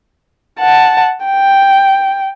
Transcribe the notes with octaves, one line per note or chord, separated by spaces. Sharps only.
F#5 A5
G5